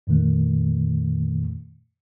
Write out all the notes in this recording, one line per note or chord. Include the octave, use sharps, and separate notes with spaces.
F2 A#2 D#3 A3